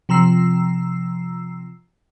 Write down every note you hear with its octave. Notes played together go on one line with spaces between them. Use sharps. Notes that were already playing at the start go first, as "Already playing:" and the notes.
C3 F3 A#5 E6 C7